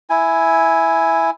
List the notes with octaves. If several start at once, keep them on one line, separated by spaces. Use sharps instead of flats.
E4 G#5